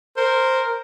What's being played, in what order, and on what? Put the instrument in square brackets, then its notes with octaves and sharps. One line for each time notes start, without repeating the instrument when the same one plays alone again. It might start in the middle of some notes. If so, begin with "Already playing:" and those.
[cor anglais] A#4 [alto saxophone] C5